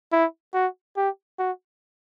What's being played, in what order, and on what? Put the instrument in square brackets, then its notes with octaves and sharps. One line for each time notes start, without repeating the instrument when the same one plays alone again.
[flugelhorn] E4
F#4
G4
F#4